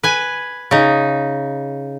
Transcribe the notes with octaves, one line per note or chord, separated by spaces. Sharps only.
B4 G#5
C#3 D#4